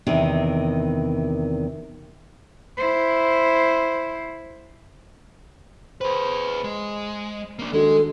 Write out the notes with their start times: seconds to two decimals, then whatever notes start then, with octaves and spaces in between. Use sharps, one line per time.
0.06 E2 C3 D#3
2.77 E4 C5
6.01 G#4 B4 C5
6.64 G#3
7.59 A#3 D4
7.73 D#3 G#3 D4 F#4 A4